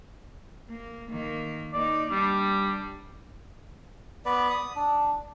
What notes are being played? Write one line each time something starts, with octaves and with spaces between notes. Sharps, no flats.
A#3
D#3 A#3
A#3 D#4 D5
G3 D4
B3 B4 D5
D#6
D4